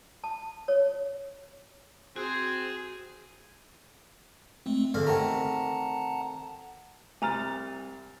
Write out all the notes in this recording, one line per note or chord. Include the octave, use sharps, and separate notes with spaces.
A5
C#5
C4 F#4 G#4
G#3 A3 C4
E2 G2 D3 F5
C3 D#3 A3 F#5 A5 A#5
C2 G#5 A#5 F6 A6